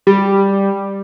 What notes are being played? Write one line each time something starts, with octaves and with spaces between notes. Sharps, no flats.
G3